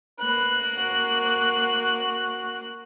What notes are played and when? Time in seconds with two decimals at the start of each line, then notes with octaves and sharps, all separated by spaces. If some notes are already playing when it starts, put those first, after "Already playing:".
0.19 A#3 B4 F#6
0.77 F#4